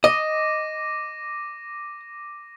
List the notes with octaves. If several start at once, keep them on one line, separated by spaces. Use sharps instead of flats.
D#5 D6 A#6 D#7